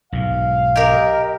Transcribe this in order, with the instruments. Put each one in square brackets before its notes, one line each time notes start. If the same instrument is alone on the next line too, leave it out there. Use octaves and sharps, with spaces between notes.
[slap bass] B1 G#2 [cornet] F5
[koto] G4 A#4 [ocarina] D#5